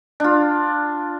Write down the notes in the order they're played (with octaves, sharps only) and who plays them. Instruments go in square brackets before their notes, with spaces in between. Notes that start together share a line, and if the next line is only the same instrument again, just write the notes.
[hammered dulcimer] D4 F4